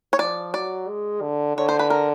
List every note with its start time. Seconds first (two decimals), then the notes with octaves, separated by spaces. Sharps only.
0.13 C#5
0.19 F3 D5
0.53 F#3 D5
0.88 G#3
1.21 D3
1.56 D3 C#5
1.69 C5
1.79 B4
1.90 A#4